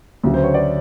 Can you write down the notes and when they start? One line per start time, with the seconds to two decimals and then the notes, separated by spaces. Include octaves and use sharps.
0.23 D2 C#3 F#3
0.34 C5
0.44 C#5
0.54 D5